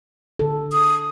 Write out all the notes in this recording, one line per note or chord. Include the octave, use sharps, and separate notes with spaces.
D3 A4
D#6